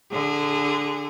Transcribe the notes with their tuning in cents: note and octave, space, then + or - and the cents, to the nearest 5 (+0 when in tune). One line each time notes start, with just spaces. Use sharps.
D3 +0 G#4 -25